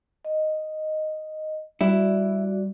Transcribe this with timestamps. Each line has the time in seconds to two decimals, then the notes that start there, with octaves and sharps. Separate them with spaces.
0.25 D#5
1.81 G3 E4 F#4 D5